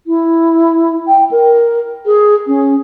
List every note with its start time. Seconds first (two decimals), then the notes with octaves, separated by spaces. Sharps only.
0.07 E4
1.07 G5
1.31 A#4
2.06 G#4
2.47 C#4